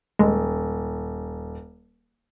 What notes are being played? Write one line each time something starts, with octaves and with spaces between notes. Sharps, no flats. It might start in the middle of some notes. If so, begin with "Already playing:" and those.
D#1 G#3